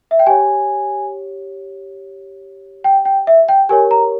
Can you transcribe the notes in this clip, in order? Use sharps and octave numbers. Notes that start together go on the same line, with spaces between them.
E5
G5
G4 C#5 G#5
G5
G5
E5
G5
G4 A#4 C#5 G#5
A#5